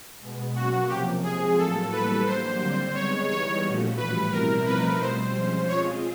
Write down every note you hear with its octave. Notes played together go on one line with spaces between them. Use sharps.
B2 G#3 B3
F#3 A#3 C#4 F#4
C3 F3 A#3 G4
F3 G#3 C4 G#4
A2 F#3 A#3 A4
E3 G3 A#3 B4
F#3 A#3 D4 G4 C5
D3 G3 C4
G#3 B3 D#4 G#4 C#5
E3 G3 B3 D#4 C#5
A#2 F3 A3 C#4 F#4
A2 E3 G3 B4
B2 G3 C4 E4 A#4
F3 A3 C4 D#4 B4
B2 G3 C4 C5
F3 G#3 C#4
G#3 C4 F4 G#4 C#5